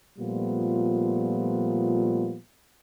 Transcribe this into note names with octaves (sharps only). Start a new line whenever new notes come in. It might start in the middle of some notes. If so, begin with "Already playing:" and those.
A#2 F3 G3 A3 B3 F4